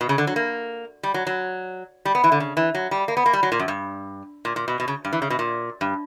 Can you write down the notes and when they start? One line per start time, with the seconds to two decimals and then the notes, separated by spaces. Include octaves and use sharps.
0.01 B2
0.09 C#3
0.18 D3
0.27 F#3
0.36 A#3
1.03 G3
1.14 F#3
1.27 F#3
2.05 G3
2.15 B3
2.24 E3
2.32 D3
2.40 C#3
2.57 E3
2.75 F#3
2.91 G3
3.08 A#3
3.17 B3
3.26 A#3
3.33 G3
3.43 F#3
3.52 A#2
3.59 F#2
3.68 G2
4.45 A#2
4.56 A#2
4.68 B2
4.80 B2
4.88 C#3
5.05 G2
5.13 E3
5.22 C#3
5.30 B2
5.39 A#2
5.81 G2